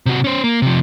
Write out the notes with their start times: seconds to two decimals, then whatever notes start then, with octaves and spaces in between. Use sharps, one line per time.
0.06 C3 F#4
0.24 C#4 C5
0.44 A#3
0.62 C3 F3